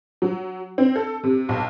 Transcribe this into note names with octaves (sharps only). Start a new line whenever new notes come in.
F#3
C4
A4
C3
B1